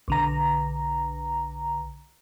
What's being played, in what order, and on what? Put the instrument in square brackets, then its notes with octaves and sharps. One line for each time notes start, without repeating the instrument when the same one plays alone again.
[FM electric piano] B1 D3 A#5